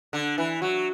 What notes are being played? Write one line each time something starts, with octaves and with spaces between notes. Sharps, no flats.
D3
E3 E4
F#3 F#4